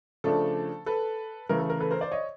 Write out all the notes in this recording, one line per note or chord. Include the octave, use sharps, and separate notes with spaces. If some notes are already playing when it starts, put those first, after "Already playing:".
C#3 F3 A3 D4 A4
A4 B4
C#3 E3 A3 A#4
A4
A#4
A4 B4
A#4 C5
C5 D5
C#5 D#5